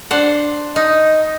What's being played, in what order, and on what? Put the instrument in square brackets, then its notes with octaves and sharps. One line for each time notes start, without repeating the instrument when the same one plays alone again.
[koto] D4 C5 F#5
[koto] D#4 [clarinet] D#5